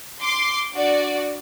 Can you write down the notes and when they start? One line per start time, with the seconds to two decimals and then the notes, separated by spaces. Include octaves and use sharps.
0.20 C6 D6 C7
0.75 D4 F#4 D5